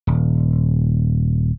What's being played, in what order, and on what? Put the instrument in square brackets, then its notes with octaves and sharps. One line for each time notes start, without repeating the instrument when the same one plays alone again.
[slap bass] D#1